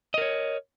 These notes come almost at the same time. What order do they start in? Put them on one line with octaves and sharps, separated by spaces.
D#5 A#4 C#5